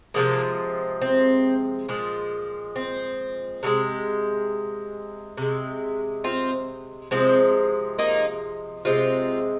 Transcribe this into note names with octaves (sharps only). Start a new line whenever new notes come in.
C3 F3 G#3 A#3
C4
A#2 F3 G#3
C4
C3 D#3 G#3
C3 G#3
C4 F4
C3 F3 G#3 C4
A#3 D#4
C3 G#3 C4 F4